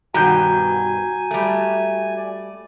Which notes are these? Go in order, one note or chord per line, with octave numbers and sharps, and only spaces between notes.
G2 B2 D#3 F#4 G#5 A#5 G6
G3 A3
D5